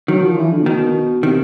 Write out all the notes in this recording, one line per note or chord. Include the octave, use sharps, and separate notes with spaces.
D#3 F#3
F3
E3
D3
A#2
B2 D#3
C3 D#3